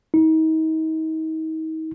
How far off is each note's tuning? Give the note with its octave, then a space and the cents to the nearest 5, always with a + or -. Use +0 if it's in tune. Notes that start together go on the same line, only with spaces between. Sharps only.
D#4 +35